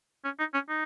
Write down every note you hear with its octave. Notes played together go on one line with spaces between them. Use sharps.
C#4
D#4
C#4
D#4